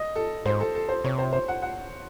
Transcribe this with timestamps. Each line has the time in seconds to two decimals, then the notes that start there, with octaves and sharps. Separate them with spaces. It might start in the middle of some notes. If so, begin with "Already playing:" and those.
Already playing: D#5
0.16 A4
0.46 G#2 C5
0.60 A4
0.75 A4
0.89 C5
1.04 C3 C#5
1.18 C5
1.33 C5
1.48 F#5
1.62 F#5